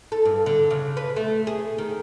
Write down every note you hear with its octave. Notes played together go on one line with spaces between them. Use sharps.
A4
G2
D3
C#3
B4
A3
G#4
D#3